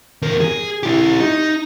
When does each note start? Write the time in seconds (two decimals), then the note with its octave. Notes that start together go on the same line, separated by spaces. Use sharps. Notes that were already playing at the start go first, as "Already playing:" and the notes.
0.22 E2 A#4
0.41 G#4
0.83 E4 G4
1.20 D#4